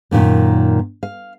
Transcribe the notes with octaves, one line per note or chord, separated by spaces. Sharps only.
F#2 A#2 D#3 A#3
F5